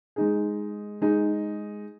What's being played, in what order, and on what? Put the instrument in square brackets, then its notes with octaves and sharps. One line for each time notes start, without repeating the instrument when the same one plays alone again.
[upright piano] G#3 D#4 G#4
G#3 D#4 G#4